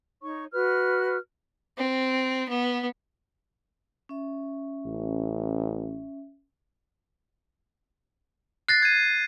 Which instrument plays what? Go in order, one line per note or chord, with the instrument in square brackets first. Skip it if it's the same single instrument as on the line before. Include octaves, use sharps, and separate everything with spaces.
[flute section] D#4 C#5 C#6
F#4 B4 F6
[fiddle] C4
B3
[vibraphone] C#4 E5
[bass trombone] A1
[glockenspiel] F#6 A6 A#6 [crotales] C7
[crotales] G#6 D#7